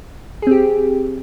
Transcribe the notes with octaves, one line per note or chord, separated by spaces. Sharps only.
C4 G4 G#4